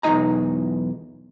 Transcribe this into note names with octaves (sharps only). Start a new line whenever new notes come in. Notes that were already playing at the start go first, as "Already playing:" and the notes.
B1 E2 F3 D#4 D#5 A#5